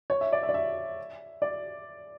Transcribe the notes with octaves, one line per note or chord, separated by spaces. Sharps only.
C#5
E5
D5
E5
D5
E5
D5